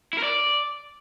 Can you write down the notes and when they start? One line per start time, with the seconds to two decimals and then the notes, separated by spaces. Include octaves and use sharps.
0.13 E4
0.18 A#4
0.24 D5